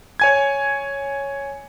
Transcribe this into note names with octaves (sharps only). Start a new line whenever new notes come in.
C#5 G#5 G#6